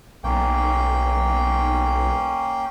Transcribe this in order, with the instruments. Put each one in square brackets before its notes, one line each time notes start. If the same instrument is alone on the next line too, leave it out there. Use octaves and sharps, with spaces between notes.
[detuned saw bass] B1 [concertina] A#3 C#4 G5